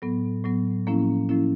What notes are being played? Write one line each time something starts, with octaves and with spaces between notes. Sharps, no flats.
A2 F#3 B3
A2 F#3 B3
A2 F3 A#3 C#4 E4
A2 F3 A#3 C#4 E4